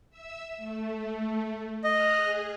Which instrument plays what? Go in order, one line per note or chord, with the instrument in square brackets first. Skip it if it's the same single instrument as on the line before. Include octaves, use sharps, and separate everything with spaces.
[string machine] E5 E6
A3
[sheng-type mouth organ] D#5 [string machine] D#6 F6 F#6
[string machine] G#4